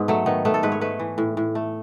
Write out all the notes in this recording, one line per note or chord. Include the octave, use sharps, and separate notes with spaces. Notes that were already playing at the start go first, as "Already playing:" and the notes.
Already playing: G#2 B3
F#3 A3
D#3 B3
A3 B3
A4
G#2 B4
C#5
A3 B4
E3
A2
A2
A3